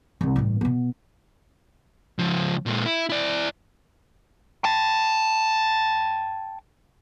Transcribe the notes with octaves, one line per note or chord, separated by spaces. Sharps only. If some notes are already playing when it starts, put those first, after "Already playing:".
C2 G2
A1 G2
B2 B3
C#2 F3
A#2 G#3
E4
E4 D5
G5 A5